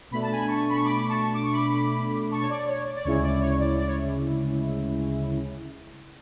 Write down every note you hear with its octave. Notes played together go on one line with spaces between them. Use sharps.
B2 A3 D4 B5
A5
G#5 B5
A5 C#6
B5
C#6
B5 D6
A5 C#6
D6
C#6
B5 D6
A5 C#6
C#5
D5
C#5
D5
D5
D2 C#3 G#3 C#4 E4 C#5
D5
C#5
D5
D5
C#5